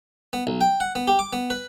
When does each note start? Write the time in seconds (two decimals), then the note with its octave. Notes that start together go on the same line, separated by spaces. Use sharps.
0.33 B3
0.47 B1
0.61 G5
0.80 F#5
0.95 B3
1.08 G4
1.19 D6
1.33 B3
1.50 B4